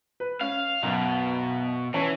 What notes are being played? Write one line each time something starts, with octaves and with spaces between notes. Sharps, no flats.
B4
C#4 F5
B1 F#2 B2
E3 C#4 C#5 A5